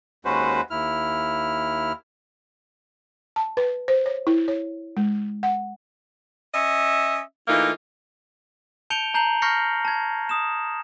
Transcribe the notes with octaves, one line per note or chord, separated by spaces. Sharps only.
D#2 G#3 C#4 F#4 B4 C5
D#2 E4 F6
A5
B4
C5
C#5
E4
C#5
G#3
F#5
C#4 D#5 E5
E3 A3 A#3 D#4 F4
A5 G6 C#7 D7 F7 G7
A5 A#5 G6 C7 F7 F#7
C#6 F6 G6 A#6 C7 C#7
A5 G#6
D#6 E7